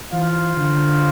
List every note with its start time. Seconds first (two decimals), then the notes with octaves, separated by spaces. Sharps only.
0.12 E3 F4 C5 F5
0.56 D3